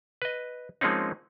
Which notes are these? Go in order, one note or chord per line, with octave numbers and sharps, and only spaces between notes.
B4 D#5
F3 G#3 A#3 C4 C#4 D#4